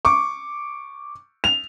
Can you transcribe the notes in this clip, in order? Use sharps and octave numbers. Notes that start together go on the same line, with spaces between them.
C#6 D6
F7